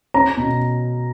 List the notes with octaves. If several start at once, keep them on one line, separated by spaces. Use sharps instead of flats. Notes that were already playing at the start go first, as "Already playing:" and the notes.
C#4 A#5
B2